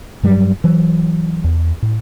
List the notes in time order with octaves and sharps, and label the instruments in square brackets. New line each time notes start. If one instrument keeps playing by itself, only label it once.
[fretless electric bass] G2 F#3 G3
E3 F#3
E2
A2